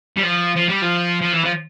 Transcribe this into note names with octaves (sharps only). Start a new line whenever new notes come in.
G3
F3
F3
G3
F3
F3
E3
F3